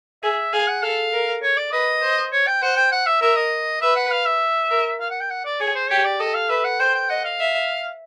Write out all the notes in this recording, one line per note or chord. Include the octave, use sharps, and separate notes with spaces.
G#4 E5
G#4 F5
F#5
A4 F5
A#4
C#5
D5
B4 D#5
C5
C#5
G5
C5 F#5
G5
F#5
E5
A#4 E5
D#5
B4 E5
F#5
F5
E5
A#4
F5
F#5
G5
F#5
D5
G#4 C#5
C5
G4 C#5
D5
A4 D#5
F5
B4 E5
F#5
C5 G5
G5
D#5 F#5
F5
E5